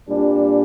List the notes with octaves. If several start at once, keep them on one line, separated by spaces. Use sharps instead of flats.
A#2 G3 C4 D4